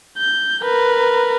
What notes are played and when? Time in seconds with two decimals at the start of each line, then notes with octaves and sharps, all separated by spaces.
0.18 G6
0.64 A#4 B4